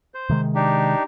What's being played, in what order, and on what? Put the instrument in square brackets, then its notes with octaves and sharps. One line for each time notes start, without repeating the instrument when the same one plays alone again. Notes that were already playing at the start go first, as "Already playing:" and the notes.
[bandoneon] C5
[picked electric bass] C3 D#3 G#3
[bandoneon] D4 D#4 G4